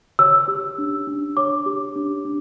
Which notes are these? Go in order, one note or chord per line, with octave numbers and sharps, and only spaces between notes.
C#5 E6
G4
D4
D4
C#5 D6
G4
D4
D4